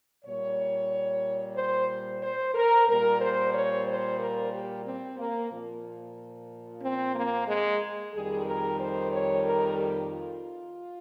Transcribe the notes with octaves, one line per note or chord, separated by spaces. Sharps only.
A#2 G3 C#5
C5
C5
A#4
A#2 G3 A#4
C5
C#5
C5
A#4
G4
C4
A#3
A#2 F3
C4
A#3
G#3
F2 D#3 G3 G#4
A#4
C5
C#5
A#4
G4
F4